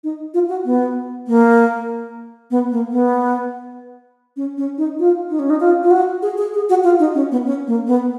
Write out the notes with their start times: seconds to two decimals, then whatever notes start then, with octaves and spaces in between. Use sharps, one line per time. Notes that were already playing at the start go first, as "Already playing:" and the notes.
0.04 D#4
0.34 F4
0.49 F#4
0.65 B3
1.27 A#3
2.51 B3
2.71 A#3
2.91 B3
4.37 C#4
4.57 C#4
4.78 D#4
4.99 F4
5.30 D#4
5.39 C#4
5.50 D#4
5.60 F4
5.83 F4
5.91 F#4
6.22 G#4
6.37 G#4
6.54 G#4
6.69 F#4
6.84 F4
6.99 D#4
7.15 C#4
7.31 B3
7.46 C#4
7.67 A#3
7.87 B3